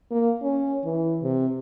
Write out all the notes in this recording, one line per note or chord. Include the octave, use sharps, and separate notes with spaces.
A#3
C#4
E3
C3